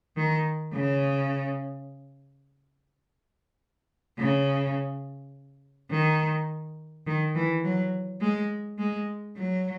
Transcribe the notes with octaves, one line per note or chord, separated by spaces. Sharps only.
D#3
C#3
C#3
D#3
D#3
E3
F#3
G#3
G#3
F#3